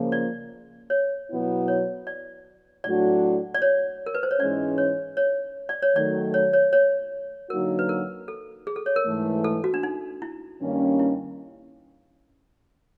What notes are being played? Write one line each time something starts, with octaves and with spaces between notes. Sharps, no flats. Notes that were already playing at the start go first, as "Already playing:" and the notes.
Already playing: C#3 F3 A#3
D5
C#5
B2 F#3 B3 E4
C#5
D5
A2 F#3 A3 D4 F#4 D5
D5
C#5
A#4
B4
C5
C#5
G#2 E3 G#3 C#4 D5
C#5
C#5
D5
C#5
D#3 F#3 A3 D5
C#5
C#5
C#5
D3 F#3 A#3 D#4 F#4 A#4
B4
A#4
A4
G#4
A4
C#5
A#4
G#2 E3 A3
A4
F#4
D4
D#4
E4
G2 D#3 G3 A#3 C#4
E4